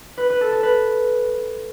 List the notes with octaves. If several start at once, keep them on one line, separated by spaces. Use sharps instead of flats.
B4
B4
A4
A4
B4